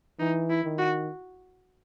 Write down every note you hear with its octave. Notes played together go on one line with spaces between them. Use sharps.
E3 D#4
E4
D#3
F#4